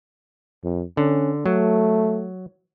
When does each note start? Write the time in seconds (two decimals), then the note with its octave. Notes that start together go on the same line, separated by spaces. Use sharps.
0.64 F2
0.97 D3 C#4
1.46 F#3 A3